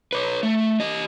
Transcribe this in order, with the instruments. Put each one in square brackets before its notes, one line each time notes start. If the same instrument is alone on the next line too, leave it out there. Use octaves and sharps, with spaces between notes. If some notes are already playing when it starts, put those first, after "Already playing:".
[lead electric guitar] B4 C#5
A3
G4 D#5